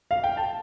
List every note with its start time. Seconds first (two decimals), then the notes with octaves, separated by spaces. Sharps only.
0.11 F5
0.24 G5
0.37 A5